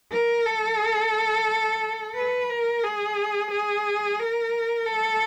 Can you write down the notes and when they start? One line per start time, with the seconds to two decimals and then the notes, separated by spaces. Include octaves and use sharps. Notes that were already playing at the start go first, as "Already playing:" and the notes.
0.12 A#4
0.46 A4
2.15 B4
2.49 A#4
2.83 G#4
3.51 G#4
4.19 A#4
4.86 A4